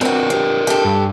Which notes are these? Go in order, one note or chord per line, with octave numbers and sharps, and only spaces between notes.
C4 D4 F#4 A#4 B4
G3
G4 A4
G2